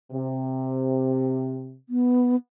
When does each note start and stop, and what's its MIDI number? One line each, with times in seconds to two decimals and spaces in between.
0.12 1.77 48
1.89 2.36 59